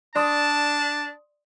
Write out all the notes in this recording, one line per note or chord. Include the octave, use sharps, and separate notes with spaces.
D4 D5 A5 C6 D#6